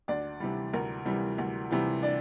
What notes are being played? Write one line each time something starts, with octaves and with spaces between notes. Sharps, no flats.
D2 D4 D5
C3 E3 G3
D2 A#4
C3 E3 G3
D2
C3 E3 G3
D4 D5